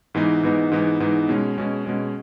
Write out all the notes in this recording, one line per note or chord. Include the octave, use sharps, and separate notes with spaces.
G#2 E3 B3 D#4
G#2 E3 B3 D#4
G#2 E3 B3 D#4
G#2 E3 B3 D#4
B2 G#3 C#4
B2 G#3 C#4
B2 G#3 C#4